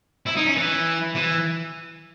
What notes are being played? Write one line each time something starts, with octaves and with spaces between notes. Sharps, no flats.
E4
D#4
C#4
E3
E3